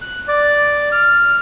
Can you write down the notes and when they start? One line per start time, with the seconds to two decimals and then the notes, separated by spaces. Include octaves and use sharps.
0.01 F#6
0.28 D5
0.92 F6